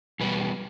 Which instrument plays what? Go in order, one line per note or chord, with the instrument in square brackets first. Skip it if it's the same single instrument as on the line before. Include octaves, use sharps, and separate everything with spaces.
[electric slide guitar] E2 B2 G3 B3 B4